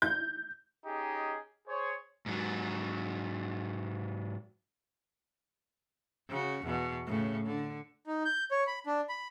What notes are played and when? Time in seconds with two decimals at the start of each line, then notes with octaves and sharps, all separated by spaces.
0.02 G6
0.86 C#4 D#4 G4 G#4 D#5
1.68 G#4 C5 C#5
2.26 G#2 F#3
6.30 C#3 F#4
6.65 E2 B2
7.06 A2 C#3
7.46 D3
8.07 D#4
8.25 G6
8.51 C#5
8.67 B5
8.87 D4
9.09 B5